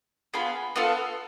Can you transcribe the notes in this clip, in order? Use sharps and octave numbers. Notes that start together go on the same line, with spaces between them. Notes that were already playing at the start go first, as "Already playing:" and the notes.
B3 F4 G#4 B5
B3 F4 A4